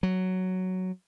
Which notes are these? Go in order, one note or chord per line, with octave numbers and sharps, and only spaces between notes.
F#3